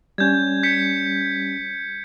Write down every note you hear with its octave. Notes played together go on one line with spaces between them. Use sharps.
G3 C#4 G6 G#6
G6 B6 C#7